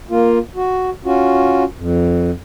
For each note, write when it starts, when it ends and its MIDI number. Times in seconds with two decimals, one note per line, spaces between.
0.10 0.38 58
0.10 0.38 65
0.56 0.90 66
1.05 1.64 61
1.05 1.64 65
1.05 1.64 66
1.78 2.31 41